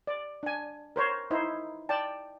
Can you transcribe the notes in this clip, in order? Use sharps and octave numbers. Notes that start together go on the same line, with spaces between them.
D5
D4 G#5
A#4 C5 C#5
D#4 E4 C5
D5 G5 A5